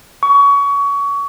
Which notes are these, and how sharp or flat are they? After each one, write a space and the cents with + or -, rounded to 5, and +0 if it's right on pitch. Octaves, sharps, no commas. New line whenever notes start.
C#6 +25